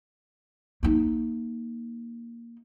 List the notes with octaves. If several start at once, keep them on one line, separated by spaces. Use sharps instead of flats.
A#3 D#4